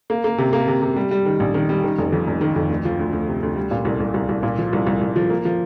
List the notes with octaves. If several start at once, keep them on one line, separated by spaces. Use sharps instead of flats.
A#3
A#3
C3
A#3
C3
C3
G3
G3
D#3
A#1
D#3
G3
D#3
F1
F2
F1
D#3
F2
D2
F3
D2
D2
C3
D2
G3
A#2
C2
C2
C2
C2
A#2
F3
C2
C2
C2
F3
A#3
F3